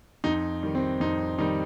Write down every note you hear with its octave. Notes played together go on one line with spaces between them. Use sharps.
F2 D#4
D#3 G3
C4
F2 D#4
D#3 G3 D#4